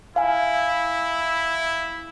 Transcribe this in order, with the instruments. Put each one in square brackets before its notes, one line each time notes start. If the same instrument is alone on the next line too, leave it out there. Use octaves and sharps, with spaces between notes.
[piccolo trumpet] E4 [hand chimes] F5 G#5